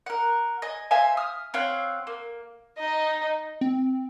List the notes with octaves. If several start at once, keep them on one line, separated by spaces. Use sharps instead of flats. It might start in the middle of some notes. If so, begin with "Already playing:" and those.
A#4 F#5
D#5 G#5
C5 E5 F5 G#5
D#6 F6
C4 C#5 F5 F#5
A#3
D#4 D#5
C4